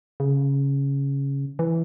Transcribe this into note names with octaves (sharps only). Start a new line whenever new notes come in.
C#3
E3